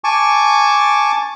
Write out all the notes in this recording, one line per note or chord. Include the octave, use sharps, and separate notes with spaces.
G#5 A5 C#6 D6